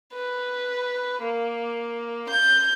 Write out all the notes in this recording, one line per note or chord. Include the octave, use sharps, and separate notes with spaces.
B4
A#3
G6